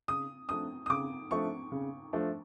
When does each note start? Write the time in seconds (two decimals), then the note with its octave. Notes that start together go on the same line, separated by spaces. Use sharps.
0.08 C#3 D#6
0.49 F3 A3 D4 D#6
0.86 D#6
0.90 C#3 D6
1.31 F3 A3 D4 C#6
1.72 C#3
2.13 F3 A3 D4